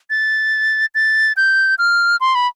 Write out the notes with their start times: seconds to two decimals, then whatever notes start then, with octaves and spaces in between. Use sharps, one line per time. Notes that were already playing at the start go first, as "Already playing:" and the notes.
0.10 A6
0.95 A6
1.37 G6
1.78 F6
2.21 C6
2.35 B5